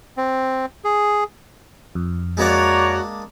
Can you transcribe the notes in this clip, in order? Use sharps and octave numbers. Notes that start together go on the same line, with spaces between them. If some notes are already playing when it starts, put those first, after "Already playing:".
C4
G#4
F2
G#3 A#3 D4 F#4 C#5 D5 A#5